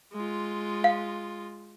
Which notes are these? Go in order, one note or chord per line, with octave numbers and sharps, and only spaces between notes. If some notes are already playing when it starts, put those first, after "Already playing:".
G#3 F4
F5